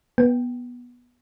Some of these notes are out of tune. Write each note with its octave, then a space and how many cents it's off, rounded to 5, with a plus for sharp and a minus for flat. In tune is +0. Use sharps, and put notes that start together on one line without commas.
B3 -15 G5 +0